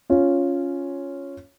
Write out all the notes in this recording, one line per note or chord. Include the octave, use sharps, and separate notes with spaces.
C#4 F4